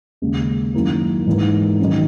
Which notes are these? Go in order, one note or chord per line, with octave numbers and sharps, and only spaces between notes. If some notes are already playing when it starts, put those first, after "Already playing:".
D#2 C#3 G#3
F#2 D#3 A#3 E4 A#4
G#2 E3 G#3 D#4 A#4
D#3 F#3 C#4